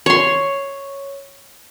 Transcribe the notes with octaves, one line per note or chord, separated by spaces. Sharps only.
C#5 C6